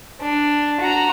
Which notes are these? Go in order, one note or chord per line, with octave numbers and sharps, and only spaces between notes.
D4
F#4 A#5